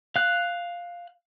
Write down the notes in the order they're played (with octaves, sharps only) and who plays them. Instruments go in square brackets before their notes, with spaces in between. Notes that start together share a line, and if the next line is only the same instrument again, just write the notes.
[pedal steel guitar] F5 F#6